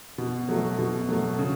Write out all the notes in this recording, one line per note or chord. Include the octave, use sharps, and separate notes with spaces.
B2
F#3 A3
B2
F#3 A3
C#3